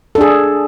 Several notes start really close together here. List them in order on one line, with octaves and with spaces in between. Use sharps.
A4 D4 G#4